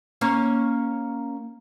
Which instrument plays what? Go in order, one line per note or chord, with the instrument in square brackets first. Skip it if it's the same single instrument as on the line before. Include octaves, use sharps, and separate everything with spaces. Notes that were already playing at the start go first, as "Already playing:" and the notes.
[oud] A#3 C#4 C#5